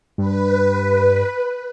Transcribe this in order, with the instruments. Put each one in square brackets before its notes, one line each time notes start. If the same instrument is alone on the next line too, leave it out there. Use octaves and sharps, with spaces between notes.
[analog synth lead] G2 [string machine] B4